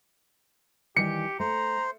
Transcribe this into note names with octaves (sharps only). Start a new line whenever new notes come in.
D#3 E3 G3 G4 C#7
A3 C5 A#5